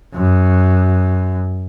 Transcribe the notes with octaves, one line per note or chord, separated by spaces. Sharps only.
F#2